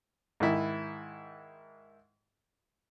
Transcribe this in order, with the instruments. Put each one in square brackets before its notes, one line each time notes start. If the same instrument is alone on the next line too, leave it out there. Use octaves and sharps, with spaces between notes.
[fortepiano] G#2 D#3 E4